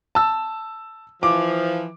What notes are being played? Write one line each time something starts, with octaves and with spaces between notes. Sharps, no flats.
A5 E6
E3 F3 D6